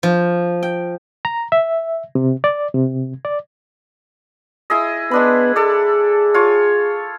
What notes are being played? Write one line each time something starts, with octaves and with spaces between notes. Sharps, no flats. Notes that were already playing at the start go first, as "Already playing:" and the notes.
F3
G5
A#5
E5
C3
D5
C3
D5
E4 G#4 D#5
G#3 B3 D4 B5
G#4 A4 D5
F4 C#5